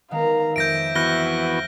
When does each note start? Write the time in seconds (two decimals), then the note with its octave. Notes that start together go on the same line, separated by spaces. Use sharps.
0.11 D#3 G#3 B3 F5 A#5
0.56 F2 G#3 E5 G6 A#6 D7
0.95 E3 B3 F#4 F6 A#6 G7